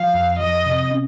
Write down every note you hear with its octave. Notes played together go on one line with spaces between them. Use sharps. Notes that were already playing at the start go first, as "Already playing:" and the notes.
Already playing: F3 F5
F2
F3 D#5
C3
C#4